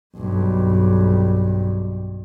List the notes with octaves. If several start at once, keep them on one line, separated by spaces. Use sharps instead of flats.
B1 G2